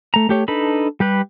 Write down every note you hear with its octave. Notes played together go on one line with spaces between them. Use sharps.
A3 A#5
A3 G4 C#5
D4 D#4 A4 B4 B5
G3 G4 B4